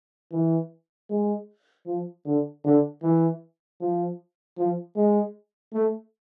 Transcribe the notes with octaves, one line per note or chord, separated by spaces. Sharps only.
E3
G#3
F3
D3
D3
E3
F3
F3
G#3
A3